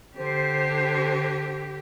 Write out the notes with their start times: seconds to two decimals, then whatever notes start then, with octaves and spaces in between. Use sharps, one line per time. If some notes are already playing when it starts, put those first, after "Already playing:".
0.17 D3 G4 C5